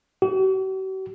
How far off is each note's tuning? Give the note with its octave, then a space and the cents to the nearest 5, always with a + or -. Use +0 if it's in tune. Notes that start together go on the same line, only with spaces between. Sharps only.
F#4 +45